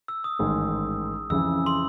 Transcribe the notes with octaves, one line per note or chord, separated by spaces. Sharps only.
E6
D#6
A1 G#2 D#3 G#3
F2 C#3 E3 E6
C6